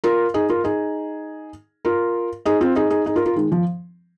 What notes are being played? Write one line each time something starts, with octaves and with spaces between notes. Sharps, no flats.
F4 A#4
D#4 G#4
F4 A#4
D#4 G#4
F4 A#4
D#4 G#4
C4 F4
D#4 G#4
D#4 G#4
D#4 G#4
F4 A#4
F4 A#4
D#3 G#3
F3